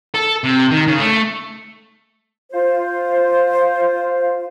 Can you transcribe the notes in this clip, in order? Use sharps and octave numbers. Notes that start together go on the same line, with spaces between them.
A4
C3
D#3
C#3
A3
F4 C5